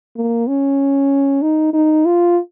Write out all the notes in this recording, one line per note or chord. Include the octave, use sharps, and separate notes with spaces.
A#3
C#4
D#4
D#4
F4